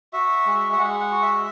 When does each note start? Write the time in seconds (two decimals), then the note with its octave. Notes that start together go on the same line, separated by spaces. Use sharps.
0.13 F#4 E5
0.46 G#3
0.73 E5
0.78 G#3 F#5
1.00 F#5
1.11 F#4
1.22 E5